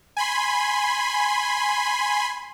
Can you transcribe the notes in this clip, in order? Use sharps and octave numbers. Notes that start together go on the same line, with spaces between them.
G#5 B5 C6